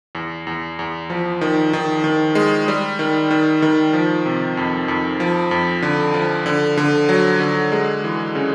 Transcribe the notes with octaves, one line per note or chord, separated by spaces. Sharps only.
E2
E2
E2
F3
D#3
D#3
D#3
G#3
G3
D#3
D#3
D#3
F3
C3
F2
F2
F3
F2
D3
F3
D3
D3
F#3
D3
G#3
E3
C#3